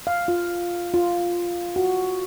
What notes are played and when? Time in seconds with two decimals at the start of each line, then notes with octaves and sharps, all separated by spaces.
0.07 F5
0.28 F4
0.94 F4
1.76 F#4